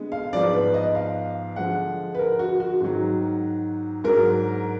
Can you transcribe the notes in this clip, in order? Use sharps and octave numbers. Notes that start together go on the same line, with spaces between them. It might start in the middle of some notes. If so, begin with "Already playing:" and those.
Already playing: D3 G#3 B3
F5
G#2 F3 B3 D5
B4
D#5
F5
D3 F3 G#3 F#5
B4
A#4
F#4
F#4
G#2 D#3 F#3
G#2 F#3 D4 A#4